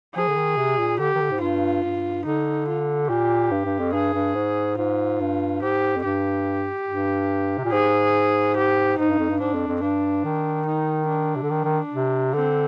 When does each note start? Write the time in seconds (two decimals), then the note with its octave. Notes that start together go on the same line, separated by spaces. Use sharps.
0.15 F3 G#4
0.28 D3
0.36 D#3
0.57 C3
0.78 A#2
0.99 D3 G4
1.16 D#3
1.20 D3
1.31 G#2
1.41 G2 F4
1.84 G2
2.25 D3 D#4
2.68 F4
3.09 A#2 G4
3.51 G2
3.65 G2
3.79 F2
3.93 G2 G#4
4.14 G2
4.35 G#2
4.77 G#2 F4
5.20 G2
5.62 G#2 G4
5.96 F2
6.04 G2 G4
6.88 G2
7.58 C3
7.64 A#2
7.72 G#2 G#4
8.56 G4
8.98 G#2 D#4
9.09 G2
9.19 F2
9.29 G2
9.40 G#2 D4
9.54 F2
9.68 F2
9.82 G2 D4
10.24 D#3
10.66 D#4
11.08 D4
11.36 C3
11.43 D3
11.50 D#3
11.65 D#3
11.93 C3
12.34 D3 C4